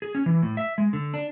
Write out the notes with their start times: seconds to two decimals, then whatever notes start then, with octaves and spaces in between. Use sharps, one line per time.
0.02 G#4
0.15 C#4
0.26 E3
0.42 A2
0.57 E5
0.78 G#3
0.93 D3
1.14 D4